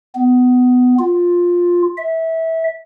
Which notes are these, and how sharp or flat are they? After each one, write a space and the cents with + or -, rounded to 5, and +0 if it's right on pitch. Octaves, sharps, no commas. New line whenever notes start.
B3 +20
F4 +10
E5 -20